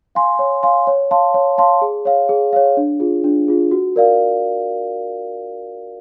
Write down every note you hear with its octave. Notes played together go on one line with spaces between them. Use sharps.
F5 G#5 C6
C#5
F5 G#5 C6
C#5
F5 A5 C6
C#5
F5 A5 C6
G#4
C#5 F5
G#4
C#5 F5
D4
F4 G#4
D4
F4 G#4
F#4
A#4 D5 F5